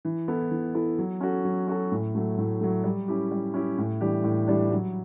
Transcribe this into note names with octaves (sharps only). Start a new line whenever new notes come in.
E3
B3 E4 A4
E3
B3 E4 A4
F#3
C#4 F#4 A4
F#3
C#4 F#4 A4
A2
F#3 A3
A2
F#3 A3
G3
C#4 E4 G4
G3
C#4 E4 G4
A2
E3 G3 D4 G4
A2
E3 G3 D4 G4
F#3